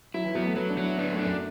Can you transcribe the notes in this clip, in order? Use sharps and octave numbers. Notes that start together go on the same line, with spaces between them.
F#3 E4
E3
F#3 B3
A3
F#3 B3
D4
F#3
E4
B3 D4
A3
D4
F#2